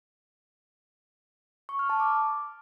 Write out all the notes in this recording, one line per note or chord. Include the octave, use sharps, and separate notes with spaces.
C#6
F6
A5
D6